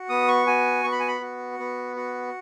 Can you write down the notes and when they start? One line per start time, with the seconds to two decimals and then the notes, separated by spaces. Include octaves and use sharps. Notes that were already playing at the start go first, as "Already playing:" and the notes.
Already playing: F#4
0.09 B3 D#6
0.28 C#6
0.47 F#4 G#5
0.84 B3 C#6
0.92 B5
1.00 G#5
1.08 B5
1.21 F#4
1.59 B3
1.96 F#4